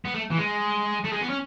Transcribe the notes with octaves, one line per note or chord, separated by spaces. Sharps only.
B3
A3
E3
G#3
A3
G#3
B3
C#4